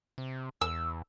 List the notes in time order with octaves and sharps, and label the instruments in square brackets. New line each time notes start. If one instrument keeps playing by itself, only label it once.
[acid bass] C3
[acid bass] E2 [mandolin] E6